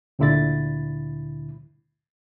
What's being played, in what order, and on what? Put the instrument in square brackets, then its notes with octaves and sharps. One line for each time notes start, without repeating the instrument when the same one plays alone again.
[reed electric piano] D2 A#2 D3 E4 B5 A6